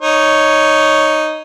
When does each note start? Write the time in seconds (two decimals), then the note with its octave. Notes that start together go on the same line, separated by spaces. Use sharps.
0.02 D#4 C#5